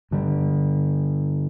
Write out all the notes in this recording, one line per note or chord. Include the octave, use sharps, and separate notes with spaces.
G2 D3 G3